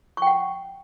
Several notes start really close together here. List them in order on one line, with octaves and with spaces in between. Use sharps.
C#6 G5 F#5